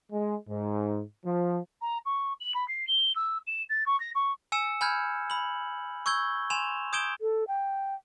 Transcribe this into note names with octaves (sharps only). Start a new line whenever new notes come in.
G#3
G#2
F3
A#5
C#6
F#7
B5
C7
G7
E6
E7
A6
C#6
A#6
C#6
G#5 E6 C#7 E7
G#5 B5 F6 G6 G#6
B5 F#7
C#6 E6 G6 G#6 G7
G#5 C6 E7 F7
D#6 G6 G#6 D7 E7 G7
A4
G5